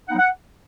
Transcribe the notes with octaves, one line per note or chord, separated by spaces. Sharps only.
F#3 B3 D#4 F#5
F#5